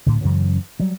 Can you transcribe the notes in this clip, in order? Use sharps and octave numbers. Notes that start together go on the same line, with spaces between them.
D2 A2 D3
F#2 C#3 E3 F#3
F#3 G3